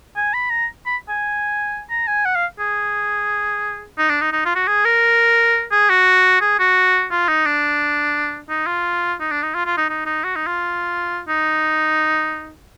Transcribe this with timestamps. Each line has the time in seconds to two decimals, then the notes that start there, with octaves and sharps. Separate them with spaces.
0.16 G#5
0.34 B5
0.50 A#5
0.86 B5
1.09 G#5
1.90 A#5
2.08 G#5
2.25 F#5
2.35 F5
2.59 G#4
3.98 D#4
4.09 D4
4.21 D#4
4.32 D#4
4.45 F4
4.55 F#4
4.67 G#4
4.85 A#4
5.72 G#4
5.89 F#4
6.41 G#4
6.59 F#4
7.11 F4
7.28 D#4
7.45 D4
8.49 D#4
8.67 F4
9.20 D#4
9.31 D4
9.43 D#4
9.55 F4
9.66 F4
9.77 D#4
9.89 D#4
10.06 D#4
10.24 F#4
10.36 D#4
10.47 F4
11.28 D#4